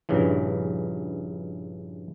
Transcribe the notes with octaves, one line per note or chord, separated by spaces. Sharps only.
A#1 G2 C#3 E3